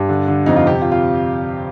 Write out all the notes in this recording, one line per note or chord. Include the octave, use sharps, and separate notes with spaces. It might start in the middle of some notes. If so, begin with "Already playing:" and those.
Already playing: G2 G4
D3
D3
F2 D#4
F4
C3 G4
F4
F4